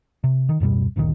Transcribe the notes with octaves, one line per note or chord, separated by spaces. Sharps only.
C3
D#3
D1 F#2 B2 G3
G1 D2 A#2 D#3